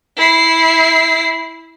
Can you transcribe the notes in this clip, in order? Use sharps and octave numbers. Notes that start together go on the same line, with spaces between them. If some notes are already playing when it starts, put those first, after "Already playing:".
E4 C7